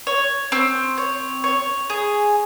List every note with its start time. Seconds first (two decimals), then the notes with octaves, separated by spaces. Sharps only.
0.07 C#5
0.52 C4
0.98 C#5
1.44 C#5
1.90 G#4